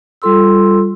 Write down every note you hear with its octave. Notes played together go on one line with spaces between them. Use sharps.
G3 F4 A4 C6 E6